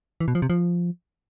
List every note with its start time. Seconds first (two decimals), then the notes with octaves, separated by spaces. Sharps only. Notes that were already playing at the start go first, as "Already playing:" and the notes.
0.21 E3
0.28 B2
0.35 F3
0.42 C3
0.50 F3